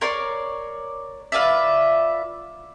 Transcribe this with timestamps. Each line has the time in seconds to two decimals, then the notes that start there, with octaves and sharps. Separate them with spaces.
0.01 A#4 C#5 D5 C6
1.32 F4 B4 D5 E5